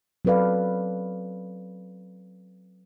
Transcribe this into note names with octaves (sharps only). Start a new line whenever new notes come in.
F#3 C4 A4 B4 D5 F5